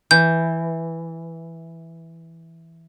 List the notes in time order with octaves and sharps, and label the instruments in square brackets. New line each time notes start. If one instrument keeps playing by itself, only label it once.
[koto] E3 [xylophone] G6